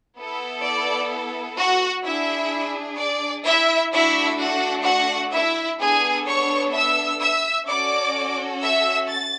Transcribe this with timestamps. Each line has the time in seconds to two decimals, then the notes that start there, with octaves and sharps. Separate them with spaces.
0.16 B3 E4 A4
0.64 D5
1.57 F#4 F#5
2.04 D4 E4 G#4 E5
2.98 D5
3.45 E4 E5
3.92 A3 D4 E4 F#4 A4 E5
4.39 F#4 F#5
4.85 F#4 F#5
5.33 E4 E5
5.80 B3 D4 G#4 A4 G#5
6.27 C#5 C#6
6.73 E5 E6
7.20 E5 E6
7.67 C#4 F#4 A4 D5 D6
8.61 E5 E6
9.08 A6